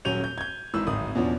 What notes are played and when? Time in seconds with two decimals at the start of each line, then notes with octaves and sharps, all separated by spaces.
0.05 D#1 F#3 C#4 G6 D#7 F7
0.24 G6
0.38 G6 G#6
0.74 G#1 G#2 E3 E6
0.87 D1 G#1 D#6
1.15 E2 B2 F3 C#4 D4